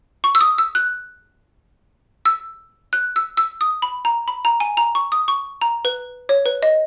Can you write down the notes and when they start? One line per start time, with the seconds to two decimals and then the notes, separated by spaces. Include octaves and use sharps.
0.24 C#6
0.35 E6
0.41 D#6
0.58 E6
0.75 F#6
2.25 E6
2.93 F#6
3.16 E6
3.37 E6
3.61 D#6
3.82 B5
4.05 A#5
4.28 B5
4.45 A#5
4.60 G#5
4.77 A#5
4.95 C#6
5.12 D#6
5.28 C#6
5.61 A#5
5.85 B4
6.29 C#5
6.46 B4
6.63 D#5